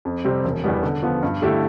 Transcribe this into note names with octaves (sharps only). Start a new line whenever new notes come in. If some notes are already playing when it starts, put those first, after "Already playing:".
F2
C3 G3 C4 G4
E1
E2 B2 G3 B3
D3
F3 B3
G2
D3 A3 E4 G4